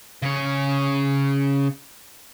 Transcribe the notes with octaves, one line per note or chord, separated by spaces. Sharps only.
C#3 C#5